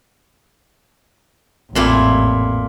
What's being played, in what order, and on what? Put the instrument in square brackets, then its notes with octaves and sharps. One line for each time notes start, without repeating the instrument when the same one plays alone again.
[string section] A1 [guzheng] F2 A#2 E4